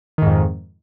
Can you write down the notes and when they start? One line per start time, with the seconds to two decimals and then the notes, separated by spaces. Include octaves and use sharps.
0.18 D#3
0.22 G#2
0.27 F2